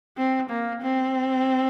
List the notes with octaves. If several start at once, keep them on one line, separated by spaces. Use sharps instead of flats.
C4
A#3
C4